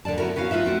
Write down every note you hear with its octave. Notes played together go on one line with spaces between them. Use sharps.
D#2 D3 G#3 D5 A5
B3 C#4 E4 F#4 A#4
B3 C#4 F#4 F5
D#4 F4 B4 E5
A3 C4 F#4